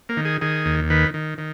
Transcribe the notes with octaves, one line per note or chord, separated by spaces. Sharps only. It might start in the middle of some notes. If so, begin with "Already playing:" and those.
A#3
D#3
G#4
D#3 G#4
D#2
D#3 B4
D#3
D#3